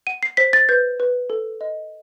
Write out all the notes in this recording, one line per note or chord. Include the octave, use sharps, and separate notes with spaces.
F#5 D#7
C7
C5 B6
A6
B4 G6
B4
A4
D#5